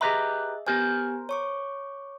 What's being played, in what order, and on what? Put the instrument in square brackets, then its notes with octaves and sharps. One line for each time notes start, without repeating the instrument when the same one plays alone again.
[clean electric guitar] G4 B4 A#5 [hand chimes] G#4 D#5 E5
[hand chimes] B3 G4 G#5 [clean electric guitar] A#4 C5
[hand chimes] C#5 C#6 D6